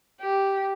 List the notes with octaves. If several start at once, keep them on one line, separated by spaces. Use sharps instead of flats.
G4